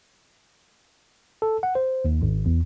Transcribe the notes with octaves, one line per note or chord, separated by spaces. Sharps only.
A4
F#5
C5
D#2
G#1
E2